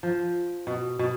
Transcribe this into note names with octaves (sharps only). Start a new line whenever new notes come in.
F3
B2
B2